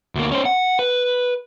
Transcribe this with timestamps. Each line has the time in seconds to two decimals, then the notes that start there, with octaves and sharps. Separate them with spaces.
0.15 D2 A#3
0.32 C#4 C5
0.45 F#5
0.79 B4